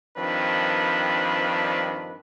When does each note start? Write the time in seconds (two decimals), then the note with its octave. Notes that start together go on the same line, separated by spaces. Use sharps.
0.17 G2 D#3 F3 C4 D4 B4